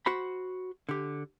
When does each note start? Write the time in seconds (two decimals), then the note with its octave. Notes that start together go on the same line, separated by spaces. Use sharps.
0.06 F#4 C5 B5
0.89 D3 G4